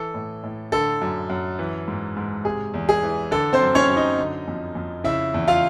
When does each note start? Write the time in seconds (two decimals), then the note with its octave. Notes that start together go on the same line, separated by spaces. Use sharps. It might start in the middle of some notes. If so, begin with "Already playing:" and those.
Already playing: E3 A4
0.14 A2
0.43 A2
0.72 D3 A4
1.02 F#2
1.30 F#2
1.59 E3
1.88 G#2
2.17 G#2
2.45 C3 G#4
2.74 E2
2.89 G#4
3.03 E3
3.31 D3 A4
3.53 C4 C5
3.61 F#2
3.75 C#4 C#5
3.89 F#2
3.96 D#4 D#5
4.18 D3
4.48 F2
4.75 F2
5.04 C#3 E4 E5
5.34 E2
5.48 F4 F5